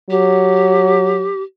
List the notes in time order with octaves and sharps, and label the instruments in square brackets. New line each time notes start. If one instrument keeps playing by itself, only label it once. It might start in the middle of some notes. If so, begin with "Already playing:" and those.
[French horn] F#3 [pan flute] G4